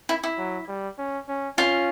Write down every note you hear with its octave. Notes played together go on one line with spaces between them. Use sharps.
E4
E4
F#3
G3
C#4
C#4
C#4 F4